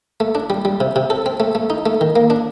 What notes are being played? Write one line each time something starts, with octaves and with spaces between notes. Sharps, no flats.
A3
D4
G3
G3
C3
C3
A4
C4
A3
A3
D#4
A3
D#3
A#3
D4